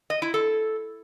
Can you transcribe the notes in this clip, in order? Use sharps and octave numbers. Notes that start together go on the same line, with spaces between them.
D#5
E4
A4